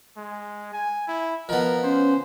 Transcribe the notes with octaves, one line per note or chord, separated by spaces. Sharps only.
G#3
G#5
E4
F3 B3 A#4 D#5
C#4 C5